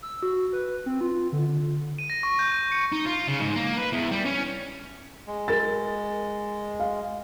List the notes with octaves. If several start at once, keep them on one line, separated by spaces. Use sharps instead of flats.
E6
F#4
B4
C4
F4
D3
D#7
A#6
C#6
G6
G6
C#7
D#4
F4
C#3
G#2
A#3
B4
E2
G3
C#4
G#3
A#4 A6
F5